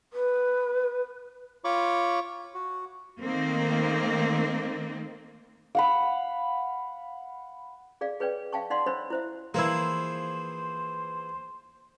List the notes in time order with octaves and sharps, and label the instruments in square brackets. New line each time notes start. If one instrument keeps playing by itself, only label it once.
[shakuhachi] B4
[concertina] F4 C#5 B5 C#6 D6
F#4
[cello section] D#3 A3 A#3 C4
[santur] F5 F#5 B5
[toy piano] G#4 D5 F5
G#4 B4 C#5 D5 G5
E5 F5 G5 A5 C#6
D#4 D5 F5 F#5 C6
D4 C5 C#5 D#5 B5 E6
E4 C5 E5
[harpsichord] E3 F3 G#4 [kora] A#3 E4 [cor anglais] C5